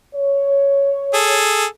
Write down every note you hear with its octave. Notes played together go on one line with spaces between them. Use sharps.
C#5
G#4 A4